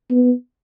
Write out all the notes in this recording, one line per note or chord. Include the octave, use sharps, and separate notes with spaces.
B3